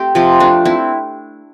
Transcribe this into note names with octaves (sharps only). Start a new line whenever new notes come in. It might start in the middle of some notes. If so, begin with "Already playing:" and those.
Already playing: A3 C4 G4
C3 F3 F4
A3 D4
C4 E4